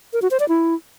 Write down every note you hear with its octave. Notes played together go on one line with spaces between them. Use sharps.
A#4
F#4
C5
D5
E4